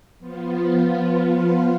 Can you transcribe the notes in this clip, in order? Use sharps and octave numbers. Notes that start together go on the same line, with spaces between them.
F3 B3 F4